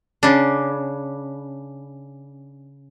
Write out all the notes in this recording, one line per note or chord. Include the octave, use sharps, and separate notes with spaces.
C#3 D4